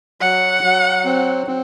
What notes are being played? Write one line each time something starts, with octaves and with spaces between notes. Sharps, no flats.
F#3 F#5
F#3
C4
C4